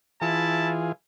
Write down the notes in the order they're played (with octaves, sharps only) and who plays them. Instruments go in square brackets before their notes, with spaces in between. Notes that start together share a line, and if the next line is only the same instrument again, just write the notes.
[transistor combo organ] E3 F4 G#4 [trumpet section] E4 A5